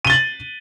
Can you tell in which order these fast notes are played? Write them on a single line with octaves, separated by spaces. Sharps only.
D#7 G7 A6 F#7